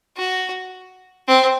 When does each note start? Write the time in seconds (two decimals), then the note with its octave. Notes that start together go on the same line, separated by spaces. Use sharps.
0.17 F#4
1.28 C4